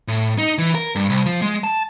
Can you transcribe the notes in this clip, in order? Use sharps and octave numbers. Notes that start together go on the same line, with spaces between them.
A2
D#4
E3
A#4
G2
C2
F3
G#3
A5